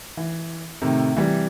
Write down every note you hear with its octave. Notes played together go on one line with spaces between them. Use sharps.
E3
A2 C3 D#3
C3 E3 G3